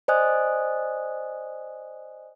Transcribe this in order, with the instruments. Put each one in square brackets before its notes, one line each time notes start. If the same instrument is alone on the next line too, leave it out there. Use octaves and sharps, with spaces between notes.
[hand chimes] C5 D5 D#5 G#5 D#6 F#6